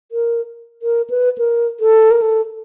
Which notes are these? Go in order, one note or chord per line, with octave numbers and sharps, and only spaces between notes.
A#4
A#4
B4
A#4
A4
A#4
A4